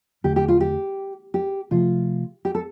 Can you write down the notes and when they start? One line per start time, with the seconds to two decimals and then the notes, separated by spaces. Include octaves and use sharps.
0.24 E2 D3 A3 G4
0.36 G4
0.48 F4
0.61 G4
1.34 G4
1.71 C3 F3 A3 F4
2.45 G4
2.55 A4